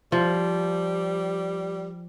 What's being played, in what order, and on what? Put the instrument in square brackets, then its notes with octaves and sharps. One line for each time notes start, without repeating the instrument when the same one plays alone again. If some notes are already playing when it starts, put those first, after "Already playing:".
[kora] F3 [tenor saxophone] G3